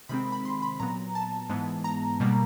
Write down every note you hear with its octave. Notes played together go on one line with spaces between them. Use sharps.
C3 D#3 G#3 C4 B5
B5
C6
B5
A#2 F#3 B3 A#5
A5
G#2 E3 G#3 B3
A#5
B2 G3 A#3